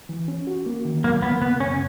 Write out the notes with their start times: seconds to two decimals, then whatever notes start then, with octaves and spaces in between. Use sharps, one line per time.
0.09 E3
0.28 C#4
0.47 F#4
0.66 A#3
0.85 D#3
1.04 F#3 A#3
1.22 A#3 B3
1.42 C#3 B3
1.60 F#2 C#4